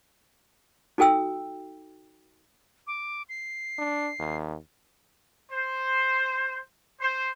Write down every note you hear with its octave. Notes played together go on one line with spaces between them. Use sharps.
D#4 F#4 A4 G5 E6
D6
C7
D4
D#2
C5
C5